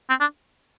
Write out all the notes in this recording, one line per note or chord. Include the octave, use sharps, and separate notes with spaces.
C4
D4